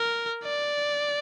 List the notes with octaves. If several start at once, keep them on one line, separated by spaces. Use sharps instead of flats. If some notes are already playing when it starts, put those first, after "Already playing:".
Already playing: A#4
D5